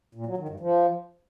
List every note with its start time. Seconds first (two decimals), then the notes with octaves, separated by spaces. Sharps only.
0.15 A#2
0.26 F#3
0.37 D#3
0.49 G2
0.60 F3